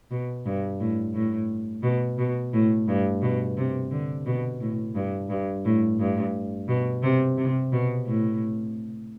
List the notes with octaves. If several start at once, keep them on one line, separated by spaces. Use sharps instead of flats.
B2
G2
A2
A2
B2
B2
A2
G2
B2
C3
D3
B2
A2
G2
G2
A2
G2
B2
C3
C3
B2
A2